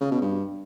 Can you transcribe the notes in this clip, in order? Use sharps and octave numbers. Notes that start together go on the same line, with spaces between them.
C#3
B2
G2